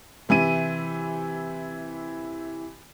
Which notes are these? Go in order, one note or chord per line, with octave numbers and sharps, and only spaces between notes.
C3 E3 E4 D#7